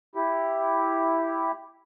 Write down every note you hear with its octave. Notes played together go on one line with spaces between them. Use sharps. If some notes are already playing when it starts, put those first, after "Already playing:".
E4 G4